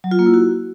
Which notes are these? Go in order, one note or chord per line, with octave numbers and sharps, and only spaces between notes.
F#3
F4
A#3
E4
F#4